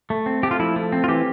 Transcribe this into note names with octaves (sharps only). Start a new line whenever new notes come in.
A3
C4
A3 G4
F4
F3 E4
A3
C4
F4
E3 G4